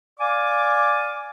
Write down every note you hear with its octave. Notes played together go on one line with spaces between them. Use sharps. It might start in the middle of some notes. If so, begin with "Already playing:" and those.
D5 F5 G#5 D6